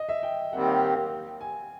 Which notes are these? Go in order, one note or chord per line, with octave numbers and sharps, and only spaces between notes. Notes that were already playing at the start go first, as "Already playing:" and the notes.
Already playing: D#5
E5
G5
D#2 D#3 G3 C4 F#5
F5
G5
G#5